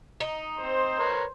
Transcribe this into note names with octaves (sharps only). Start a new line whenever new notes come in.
D#4
C4 C5
A#4 B4 C#5